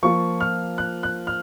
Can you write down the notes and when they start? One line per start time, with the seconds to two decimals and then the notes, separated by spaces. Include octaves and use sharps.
0.03 F3 A#3 F4 C#6
0.40 F6
0.78 F#6
1.03 F#6
1.27 F6